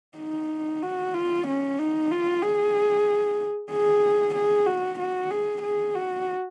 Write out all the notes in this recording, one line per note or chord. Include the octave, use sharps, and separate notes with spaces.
D#4
F#4
F4
C#4
D#4
F4
G#4
G#4
G#4
F#4
F#4
G#4
G#4
F#4